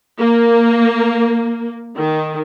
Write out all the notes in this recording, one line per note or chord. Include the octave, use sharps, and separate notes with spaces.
A#3
D#3